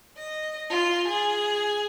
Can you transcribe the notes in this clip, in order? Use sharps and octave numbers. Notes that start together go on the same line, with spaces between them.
D#5
F4
G#4